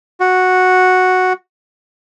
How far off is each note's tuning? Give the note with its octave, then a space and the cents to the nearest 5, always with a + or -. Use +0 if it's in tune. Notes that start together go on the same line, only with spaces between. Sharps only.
F#4 -5